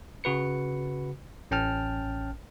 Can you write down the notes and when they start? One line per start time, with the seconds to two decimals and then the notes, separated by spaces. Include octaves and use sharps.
0.24 C#3 F#4 B4 C#7
1.51 A1 C#4 G5 A5 F6